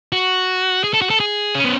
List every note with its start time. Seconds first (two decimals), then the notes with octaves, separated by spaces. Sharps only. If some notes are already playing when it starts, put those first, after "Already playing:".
0.12 F#4
0.84 G#4
0.93 A4
1.02 F#4
1.10 A4
1.20 G#4
1.55 C#4
1.64 B3